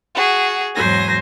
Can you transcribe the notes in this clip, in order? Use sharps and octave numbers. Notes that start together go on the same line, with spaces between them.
F#4 G#4
E2 G#2 F#3 C5 G#5 A#6